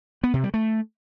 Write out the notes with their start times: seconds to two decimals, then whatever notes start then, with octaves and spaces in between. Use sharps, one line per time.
0.24 B3
0.34 C3
0.44 G3
0.54 A3